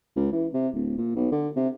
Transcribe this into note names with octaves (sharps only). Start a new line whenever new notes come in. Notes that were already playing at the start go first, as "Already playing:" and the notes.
C#2
E3
C3
D1
A#2
B1
D3
C3